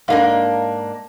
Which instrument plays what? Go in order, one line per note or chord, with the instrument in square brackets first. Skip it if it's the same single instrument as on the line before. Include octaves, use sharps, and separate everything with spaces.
[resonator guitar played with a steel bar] G#2 A#3 D4 [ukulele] A4 D#5 F5